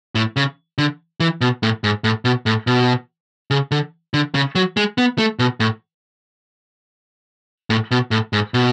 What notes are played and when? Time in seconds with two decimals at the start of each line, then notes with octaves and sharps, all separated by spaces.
0.15 A2
0.36 C#3
0.78 D3
1.20 E3
1.41 B2
1.63 A2
1.84 G#2
2.04 A2
2.25 B2
2.46 A2
2.67 B2
3.51 C#3
3.71 D3
4.14 D3
4.35 C#3
4.55 F#3
4.77 G#3
4.98 B3
5.18 A3
5.39 B2
5.60 A2
7.70 A2
7.91 B2
8.11 A2
8.33 G#2
8.54 B2